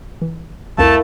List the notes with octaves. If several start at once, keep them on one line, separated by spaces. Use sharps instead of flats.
E3
C2 F2 A3 E4 A#4 F5 A5